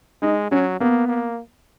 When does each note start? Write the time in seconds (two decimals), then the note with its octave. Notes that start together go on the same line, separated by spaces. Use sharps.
0.22 G#3 D#4
0.51 F#3 C#4
0.80 A#3 B3
1.08 A#3